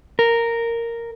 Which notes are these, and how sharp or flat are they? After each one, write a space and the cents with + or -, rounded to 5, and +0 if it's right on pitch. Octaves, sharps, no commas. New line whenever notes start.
A#4 -5